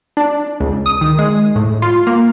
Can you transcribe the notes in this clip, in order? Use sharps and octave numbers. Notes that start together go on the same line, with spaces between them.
D4
C#2
D#6
D#3
G#3
A2
F4
A#3